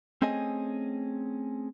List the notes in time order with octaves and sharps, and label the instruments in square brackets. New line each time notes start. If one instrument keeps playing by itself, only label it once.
[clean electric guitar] A3 C4 C#4 G#4 D#5 G#5